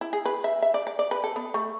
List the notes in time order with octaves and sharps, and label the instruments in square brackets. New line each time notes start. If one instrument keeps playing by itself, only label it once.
[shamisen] E4
G#4
B4
E5
E5
D5
D5
D5
B4
A4
B3
A3